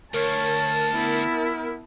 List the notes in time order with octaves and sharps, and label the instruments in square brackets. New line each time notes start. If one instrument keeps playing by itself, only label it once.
[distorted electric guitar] D2 [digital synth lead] A#4 [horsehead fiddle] C#5 [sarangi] A5
[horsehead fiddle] B3 E4